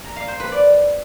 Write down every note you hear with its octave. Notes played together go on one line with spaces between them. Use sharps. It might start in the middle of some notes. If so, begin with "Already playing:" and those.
A#5
F5
C5
B4
D5